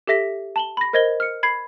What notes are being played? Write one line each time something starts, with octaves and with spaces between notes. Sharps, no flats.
G4 A4 E5 A#6 B6
A5 F#7 G7
B5 A#6
A#4 C5 D#5 G#6 A#6 G7
F6 C#7
B5 G#6 C7